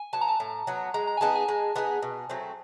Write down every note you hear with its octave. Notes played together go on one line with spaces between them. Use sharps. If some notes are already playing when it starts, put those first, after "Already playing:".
Already playing: G#5
F#3 B3 A5
A#5
A5
A2
F#3 B3
G#3 A#5
A#5
G#5
B3 D#4 G#4 A5
G#5
G#3
B3 D#4 G#4
B2
F#3 A3 C4